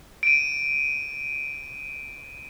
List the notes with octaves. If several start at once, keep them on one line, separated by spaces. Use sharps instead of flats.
D7 D#7